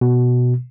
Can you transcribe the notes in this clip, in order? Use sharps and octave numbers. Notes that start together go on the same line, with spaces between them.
B2